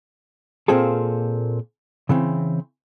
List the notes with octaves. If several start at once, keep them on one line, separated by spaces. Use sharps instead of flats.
A#2 A#3 C4 F4 G#4 A4
C#3 E3 C4